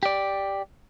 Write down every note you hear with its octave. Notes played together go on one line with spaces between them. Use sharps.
G4 D5